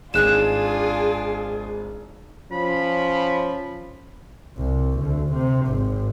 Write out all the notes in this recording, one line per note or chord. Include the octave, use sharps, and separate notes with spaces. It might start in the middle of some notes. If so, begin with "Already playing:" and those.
G#1 G#3 D4 F4 G#4 F#6 E7
F3 C#4 B5
C2
D2
C3
G#1